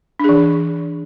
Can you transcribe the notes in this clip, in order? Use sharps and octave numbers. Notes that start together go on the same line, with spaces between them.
E3 D4 G#4